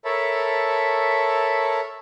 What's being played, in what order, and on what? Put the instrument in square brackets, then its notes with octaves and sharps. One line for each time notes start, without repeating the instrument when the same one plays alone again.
[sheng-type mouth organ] A4 A#4 C#5 E5 A5 B5